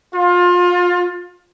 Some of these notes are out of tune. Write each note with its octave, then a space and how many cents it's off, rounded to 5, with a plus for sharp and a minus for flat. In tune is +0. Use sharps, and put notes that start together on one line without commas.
F4 +25